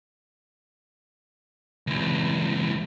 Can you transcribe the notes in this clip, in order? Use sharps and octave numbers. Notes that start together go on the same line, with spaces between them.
C#2 E3